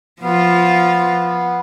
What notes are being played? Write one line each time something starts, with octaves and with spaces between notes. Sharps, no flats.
F3 B3 F4